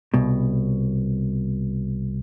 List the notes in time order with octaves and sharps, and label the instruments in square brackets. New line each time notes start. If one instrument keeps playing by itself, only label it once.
[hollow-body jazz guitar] C2 B2